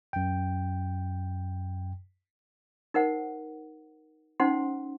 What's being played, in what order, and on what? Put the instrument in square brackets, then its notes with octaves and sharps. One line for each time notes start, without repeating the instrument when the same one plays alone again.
[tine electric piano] F#2 G5
[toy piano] D#4 A#4 C5 F#5
C#4 D#4 C5 F#5 C6